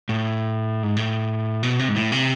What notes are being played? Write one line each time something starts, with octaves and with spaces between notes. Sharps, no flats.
A2
G#2
A2
B2
C3
G#2
A2
C3